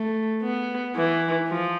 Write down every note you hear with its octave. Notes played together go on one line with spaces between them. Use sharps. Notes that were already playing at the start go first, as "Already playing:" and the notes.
Already playing: A3
B3
E3
F3